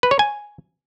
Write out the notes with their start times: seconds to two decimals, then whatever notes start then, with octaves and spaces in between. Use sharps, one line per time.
0.03 B4
0.11 C#5
0.19 G#5